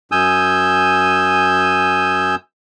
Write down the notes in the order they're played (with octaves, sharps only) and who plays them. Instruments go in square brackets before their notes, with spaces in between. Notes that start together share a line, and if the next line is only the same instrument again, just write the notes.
[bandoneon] F#2 G#5 D#6 E6 G6